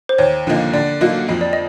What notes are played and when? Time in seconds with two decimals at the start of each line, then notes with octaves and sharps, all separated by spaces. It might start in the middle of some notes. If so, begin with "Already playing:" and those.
0.09 C5
0.18 D#2 C#5
0.47 D3 F3 A#3 D#4
0.73 D3 D5
1.01 F#3 A#3 D#4 F#4
1.28 F2 D#5
1.41 D5
1.53 D#5